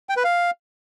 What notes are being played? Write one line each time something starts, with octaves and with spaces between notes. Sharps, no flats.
G5
B4
F5